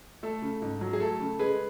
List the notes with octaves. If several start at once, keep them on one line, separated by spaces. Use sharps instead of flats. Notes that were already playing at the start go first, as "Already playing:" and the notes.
A3 A4
C#3
G#2
F#3
G#4
A3 A4
C#3
G#3 G#4 B4